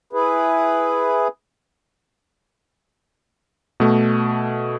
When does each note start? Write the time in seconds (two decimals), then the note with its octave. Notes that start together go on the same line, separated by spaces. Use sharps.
0.13 E4 G#4 B4
3.80 B2 A3